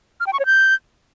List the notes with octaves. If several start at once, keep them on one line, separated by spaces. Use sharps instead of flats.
F6
G5
C#6
C#5
G6